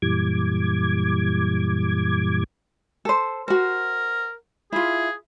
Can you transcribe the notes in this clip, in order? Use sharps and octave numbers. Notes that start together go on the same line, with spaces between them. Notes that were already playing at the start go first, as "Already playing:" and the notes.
F#2 A#2 E3 G3 D6 G#6
A4 C5
F#4 A#4 C5
E4 F4 G#4